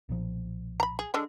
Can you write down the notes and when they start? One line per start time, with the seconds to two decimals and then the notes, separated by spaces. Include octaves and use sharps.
0.09 B1 A#2 F3
0.80 A#5 B5
0.99 G#4
1.14 D3 G#3 D4